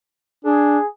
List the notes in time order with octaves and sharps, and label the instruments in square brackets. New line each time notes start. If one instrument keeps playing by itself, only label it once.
[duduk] D4 [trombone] G#4